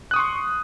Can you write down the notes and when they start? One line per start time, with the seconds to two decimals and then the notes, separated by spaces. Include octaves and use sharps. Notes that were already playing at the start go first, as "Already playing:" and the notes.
0.11 F#6
0.14 D#6
0.16 C#6
0.19 C6